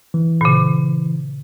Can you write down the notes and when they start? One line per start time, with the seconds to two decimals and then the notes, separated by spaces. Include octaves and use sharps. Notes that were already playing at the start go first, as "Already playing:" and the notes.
0.14 E3
0.41 A#2 C#3